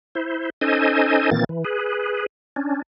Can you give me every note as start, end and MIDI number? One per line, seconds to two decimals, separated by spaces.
0.15 0.50 64
0.15 0.50 72
0.61 1.30 61
0.61 1.30 63
0.61 1.30 69
0.61 1.30 72
0.61 1.30 75
0.61 1.30 80
1.31 1.44 46
1.31 1.44 51
1.31 1.44 52
1.31 1.44 58
1.31 1.44 60
1.31 1.44 93
1.49 1.64 52
1.64 2.26 68
1.64 2.26 71
2.56 2.82 61
2.56 2.82 62